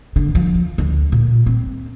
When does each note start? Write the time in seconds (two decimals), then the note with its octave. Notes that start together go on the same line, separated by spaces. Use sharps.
0.16 D3
0.35 F3
0.78 D2
1.12 A#2
1.46 C4